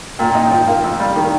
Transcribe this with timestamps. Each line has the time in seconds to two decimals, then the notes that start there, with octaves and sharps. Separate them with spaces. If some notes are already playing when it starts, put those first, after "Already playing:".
0.19 A#2 G5
0.30 G5
0.35 D#4
0.41 G5
0.51 F3 G5
0.68 A#3 F5
0.84 F2
1.00 G3
1.16 D#3